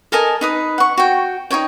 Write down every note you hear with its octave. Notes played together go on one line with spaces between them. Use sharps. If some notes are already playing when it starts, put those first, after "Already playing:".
A4 A#4 D#5 G#5
D#4 B4 D#6
F#5 C#6
F#4 G5
D#4 F#4 C#5 G5